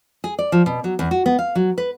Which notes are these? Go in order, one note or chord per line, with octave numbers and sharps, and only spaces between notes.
G#4
D5
F3
B2
F#3
E2
F#4
B3
F5
F#3
B4